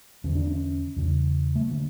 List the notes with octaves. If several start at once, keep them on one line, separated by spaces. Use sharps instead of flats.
E2 D3 C#4
D4
C#4
E2 C#3
A3
D3 A#3